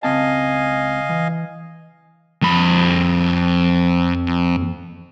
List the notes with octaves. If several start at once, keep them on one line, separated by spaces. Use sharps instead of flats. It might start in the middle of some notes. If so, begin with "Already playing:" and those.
C#2 C4 D#5 F5 G#5 A5
E3
F2 B5